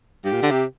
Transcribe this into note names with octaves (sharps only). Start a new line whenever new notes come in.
G2 G4
A#2
D3
C3